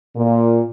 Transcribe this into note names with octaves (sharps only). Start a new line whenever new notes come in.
A#2